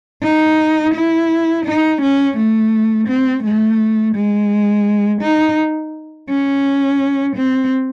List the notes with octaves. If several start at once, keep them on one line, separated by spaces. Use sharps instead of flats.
D#4
E4
D#4
C#4
A3
C4
A3
G#3
D#4
C#4
C4